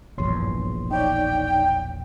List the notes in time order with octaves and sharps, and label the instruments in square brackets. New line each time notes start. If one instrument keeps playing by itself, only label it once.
[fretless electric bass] E1 A#1 E2 [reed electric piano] G2 C#5 C6
[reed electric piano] D#4 C#5 D5 [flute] G5